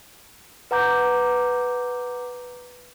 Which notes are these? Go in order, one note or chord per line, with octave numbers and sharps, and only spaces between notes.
B4 F#5 A#5 D6 G6